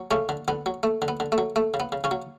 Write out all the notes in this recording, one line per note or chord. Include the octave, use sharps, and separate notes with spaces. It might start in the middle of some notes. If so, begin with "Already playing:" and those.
Already playing: F#3
C#3 A3 C#4
D3
D3 B3
F#3
A3
D3
B3
D3
A3
F#3
A3
C#3
B3
C#3
C#3 C#4
F#3